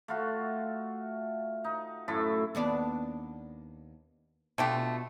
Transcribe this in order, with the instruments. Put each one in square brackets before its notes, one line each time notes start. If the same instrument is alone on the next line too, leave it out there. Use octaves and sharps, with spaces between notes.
[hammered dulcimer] A3 F4 F#4
D#4
F#2 A2 E5 A5
[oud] D#2 B3 D4
[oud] B2 F4 [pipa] D3 A3 G4